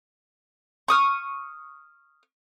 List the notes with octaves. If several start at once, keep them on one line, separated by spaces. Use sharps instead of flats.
C#6 D#6 F6